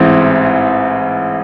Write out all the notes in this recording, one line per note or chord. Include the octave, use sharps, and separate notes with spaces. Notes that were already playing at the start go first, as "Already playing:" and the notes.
Already playing: A1 G#2 E3 C4